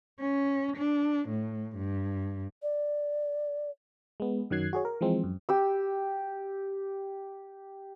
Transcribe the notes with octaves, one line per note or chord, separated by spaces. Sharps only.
C#4
D4
A2
G2
D5
G#3 B3
F#2 D#3 F#3 F#6 G#6 C7
F#4 G#4 C#5
A#4
E3 F3 G#3 C4
F#2
G4 E6